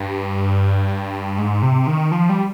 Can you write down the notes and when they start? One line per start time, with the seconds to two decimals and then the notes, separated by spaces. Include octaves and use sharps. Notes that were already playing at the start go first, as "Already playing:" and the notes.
Already playing: G2
1.38 G#2
1.62 C3
1.87 D#3
2.12 F3
2.29 G3